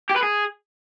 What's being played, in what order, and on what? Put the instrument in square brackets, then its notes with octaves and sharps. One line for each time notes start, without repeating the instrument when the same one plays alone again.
[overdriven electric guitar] G4
B4
G#4